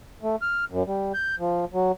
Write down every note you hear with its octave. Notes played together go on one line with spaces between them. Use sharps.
A3
F6
F#2
G3
G6
F3
F#3